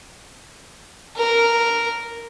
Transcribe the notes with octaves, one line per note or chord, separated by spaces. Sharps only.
A#4